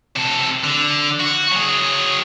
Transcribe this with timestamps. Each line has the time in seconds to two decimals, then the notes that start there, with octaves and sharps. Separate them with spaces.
0.16 C3 A4
0.64 D3
1.20 F#4
1.52 F#3 G#4